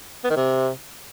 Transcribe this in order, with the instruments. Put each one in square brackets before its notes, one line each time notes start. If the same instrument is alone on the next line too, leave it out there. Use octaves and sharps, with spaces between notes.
[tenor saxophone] B3
D#3
C3